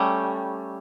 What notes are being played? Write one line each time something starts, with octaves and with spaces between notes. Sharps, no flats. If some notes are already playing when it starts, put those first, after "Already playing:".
Already playing: G3 A3 C#4